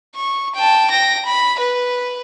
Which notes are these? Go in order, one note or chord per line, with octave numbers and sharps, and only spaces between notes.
C#6
G5 A5
G5 A#6
B5
B4